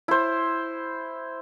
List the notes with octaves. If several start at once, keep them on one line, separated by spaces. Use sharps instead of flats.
E4 C5